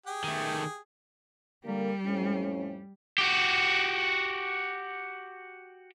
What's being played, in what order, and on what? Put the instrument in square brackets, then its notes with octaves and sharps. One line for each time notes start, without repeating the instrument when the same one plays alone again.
[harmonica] G4 G#4 G5
[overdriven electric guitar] D#3 A3
[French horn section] D3 A#3 [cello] G3
[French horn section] F2 A2 C#4
[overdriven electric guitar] F#4 G4